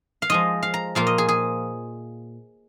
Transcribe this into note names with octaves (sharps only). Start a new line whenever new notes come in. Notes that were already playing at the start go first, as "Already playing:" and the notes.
F5
F3 G#3 F4 D#5
F5
A#5
A#2 F3 A#3 F4 F5
D#5
G#4
G#4